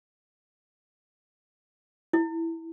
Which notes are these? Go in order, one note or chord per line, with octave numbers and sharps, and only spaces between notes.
E4